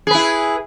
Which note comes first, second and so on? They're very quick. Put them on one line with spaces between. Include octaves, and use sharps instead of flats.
G#4 B4 E4